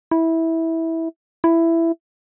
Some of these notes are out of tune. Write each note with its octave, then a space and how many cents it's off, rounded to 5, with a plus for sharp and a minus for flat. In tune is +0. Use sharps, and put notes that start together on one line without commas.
E4 -15
E4 +10